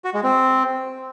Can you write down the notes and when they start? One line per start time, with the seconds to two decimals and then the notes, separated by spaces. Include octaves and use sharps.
0.04 F#4
0.14 G#3
0.24 C4